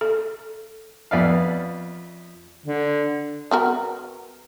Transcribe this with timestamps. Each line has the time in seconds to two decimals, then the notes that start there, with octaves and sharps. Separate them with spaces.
0.01 A4
1.11 F2 B3 D5 E5 F5
2.66 D3
3.51 B3 F#4 A#4